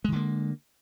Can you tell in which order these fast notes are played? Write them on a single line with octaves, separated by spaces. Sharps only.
G#3 D#3 D3 A#3